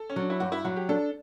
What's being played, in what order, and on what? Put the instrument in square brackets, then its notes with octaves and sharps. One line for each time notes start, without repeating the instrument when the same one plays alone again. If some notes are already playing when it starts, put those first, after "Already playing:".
Already playing: [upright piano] A4
C#4
[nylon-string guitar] F#3 [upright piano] D4
[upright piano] E4
[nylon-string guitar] G2 [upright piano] F#4
[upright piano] E4
[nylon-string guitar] F#3 [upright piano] F#4
[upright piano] G4
[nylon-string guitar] D4 [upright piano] A4